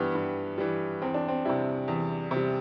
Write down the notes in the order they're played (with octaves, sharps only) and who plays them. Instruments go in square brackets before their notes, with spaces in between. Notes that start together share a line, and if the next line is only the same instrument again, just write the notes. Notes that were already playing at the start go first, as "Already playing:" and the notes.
Already playing: [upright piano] G2 E3 G3 B3
G2
E3 G3
E2 C4
D4
C4
C3 G3 E4
E2
C3
G3